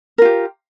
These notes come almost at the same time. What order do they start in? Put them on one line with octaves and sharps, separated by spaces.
A#4 F4 G4